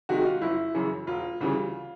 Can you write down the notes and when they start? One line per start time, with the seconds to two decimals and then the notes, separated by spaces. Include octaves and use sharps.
0.09 C3 D#3 G#3 F#4
0.26 F4
0.41 F#1 E4
0.74 F#2 C#3 E3
1.07 E1 F4
1.41 D2 C#3 E3 G3